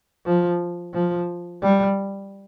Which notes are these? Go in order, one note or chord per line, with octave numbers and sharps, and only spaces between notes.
F3
F3
G3